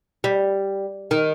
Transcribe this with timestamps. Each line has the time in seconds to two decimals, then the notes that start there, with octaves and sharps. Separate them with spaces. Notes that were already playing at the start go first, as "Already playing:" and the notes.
0.24 G3
1.11 D#3